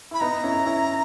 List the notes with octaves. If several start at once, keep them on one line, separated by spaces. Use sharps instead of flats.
E4 B5
B3 D#4 A#5
C#4 E4
C#4 E4